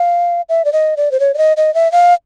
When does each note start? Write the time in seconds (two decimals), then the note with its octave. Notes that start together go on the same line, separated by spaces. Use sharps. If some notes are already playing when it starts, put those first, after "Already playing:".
Already playing: F5
0.49 E5
0.65 D5
0.73 D#5
0.97 D5
1.11 C5
1.20 C#5
1.34 D5
1.38 D#5
1.57 D#5
1.74 E5
1.92 F5